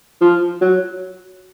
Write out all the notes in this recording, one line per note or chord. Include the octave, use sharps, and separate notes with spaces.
F3
F#3